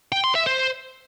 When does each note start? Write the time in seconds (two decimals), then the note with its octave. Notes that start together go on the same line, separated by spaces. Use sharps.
0.12 G5
0.24 C6
0.35 E5
0.47 C5